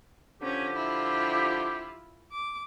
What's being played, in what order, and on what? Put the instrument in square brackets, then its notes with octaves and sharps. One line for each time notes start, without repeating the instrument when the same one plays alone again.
[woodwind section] D3 F3 G4 [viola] C#4
[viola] E4 F4
D6